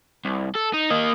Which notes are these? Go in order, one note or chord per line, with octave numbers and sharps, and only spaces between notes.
C2
A4
D#4
A#3 D#5